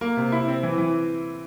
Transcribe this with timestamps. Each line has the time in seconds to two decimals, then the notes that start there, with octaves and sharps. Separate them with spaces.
0.01 A#3
0.17 C3
0.32 E4
0.48 C4
0.63 E3
0.78 E3